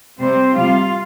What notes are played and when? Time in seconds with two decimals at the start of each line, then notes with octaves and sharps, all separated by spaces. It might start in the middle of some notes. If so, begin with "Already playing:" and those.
0.19 C3 G3 C4 C5
0.54 C3 G3 F4 F5